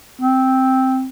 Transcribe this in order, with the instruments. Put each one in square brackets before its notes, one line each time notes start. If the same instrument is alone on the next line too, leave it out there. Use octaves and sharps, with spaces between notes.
[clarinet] C4